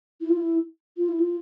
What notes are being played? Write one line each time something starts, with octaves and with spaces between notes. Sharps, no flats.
E4
F4
E4
F4
E4
F4